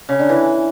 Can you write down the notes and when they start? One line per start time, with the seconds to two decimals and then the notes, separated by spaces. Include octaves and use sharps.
0.09 C#3
0.19 D3
0.29 E3